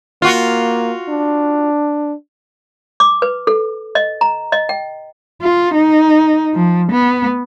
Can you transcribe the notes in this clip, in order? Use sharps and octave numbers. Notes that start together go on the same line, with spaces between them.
A#3 F4 F#4
D4
D6
B4
A4
D#5
A#5
D#5
G5
F4
D#4
F3
B3